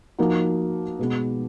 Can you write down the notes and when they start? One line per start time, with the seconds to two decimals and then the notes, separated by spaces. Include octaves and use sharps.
0.18 F3 A#3 D#4 F#4
0.99 B2 G#3 B3